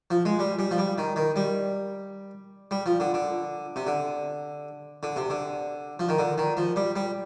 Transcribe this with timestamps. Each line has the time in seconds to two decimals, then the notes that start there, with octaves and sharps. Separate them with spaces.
0.11 F3
0.25 G#3
0.39 G3
0.59 G3
0.71 F3
0.78 G3
0.98 D#3
1.16 D#3
1.36 G3
2.71 G3
2.86 F3
3.00 D3
3.14 D3
3.76 C3
3.87 D3
5.03 D3
5.16 C3
5.30 D3
5.99 F3
6.09 D#3
6.19 D3
6.38 D#3
6.57 F3
6.76 G3
6.96 G3